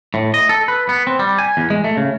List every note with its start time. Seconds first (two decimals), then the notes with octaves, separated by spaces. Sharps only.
0.14 A2
0.34 D#5
0.49 A4
0.68 B4
0.89 B3
1.07 C4
1.19 G3
1.39 G#5
1.57 E2
1.70 G#3
1.84 A3
1.97 C#3